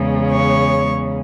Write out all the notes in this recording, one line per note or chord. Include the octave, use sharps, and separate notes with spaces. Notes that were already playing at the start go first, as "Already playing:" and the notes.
Already playing: E2 C#3 G#3
C#5